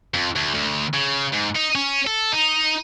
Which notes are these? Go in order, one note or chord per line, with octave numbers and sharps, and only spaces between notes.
F2
D2
D2
C#3
G#2
D#4
C#4
A4
D#4